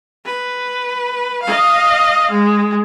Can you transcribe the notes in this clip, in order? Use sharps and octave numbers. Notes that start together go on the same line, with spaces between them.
B4
D#5 F5
G#3